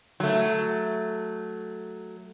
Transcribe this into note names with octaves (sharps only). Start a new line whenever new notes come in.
F#3 A3